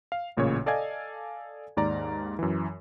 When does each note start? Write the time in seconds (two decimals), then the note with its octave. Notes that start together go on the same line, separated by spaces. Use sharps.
0.12 F5
0.37 A1 A#2 C#3 C#5
0.66 A4 D5 D#5 F5 G#5 G#6
1.77 D#2 G#2 D5 A#5
2.39 F#2 E3